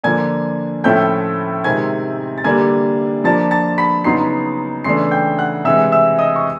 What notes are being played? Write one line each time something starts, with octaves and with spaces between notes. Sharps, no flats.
D3 F3 A#3 D4 G#5 G#6
A2 F3 A3 C#4 E4 G5 G6
C3 D#3 G#3 C4 G#5 G#6
A6
D3 G3 A#3 D4 G#5 G#6
F3 A#3 D4 A5 A6
A5 A6
B5 B6
C#3 F#3 B3 D#4 C6 C7
C#3 E3 A3 D4 C6 C7
G5 G6
F#5 F#6
C3 E3 G#3 E5 E6
E5 E6
D#5 D#6
C#6